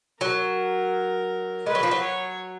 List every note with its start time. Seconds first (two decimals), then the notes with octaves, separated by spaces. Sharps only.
0.21 F#3 A#4
1.66 G#3 B4
1.75 F#3
1.83 F3
1.91 F#3
2.02 C#5